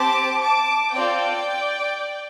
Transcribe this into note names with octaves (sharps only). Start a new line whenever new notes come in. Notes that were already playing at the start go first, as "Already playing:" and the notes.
Already playing: C4 G4 A5 D6
A5 D6
C4 F4 A4 D5 G5